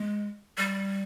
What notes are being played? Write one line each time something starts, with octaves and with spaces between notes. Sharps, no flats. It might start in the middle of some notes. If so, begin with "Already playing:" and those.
Already playing: G#3
G3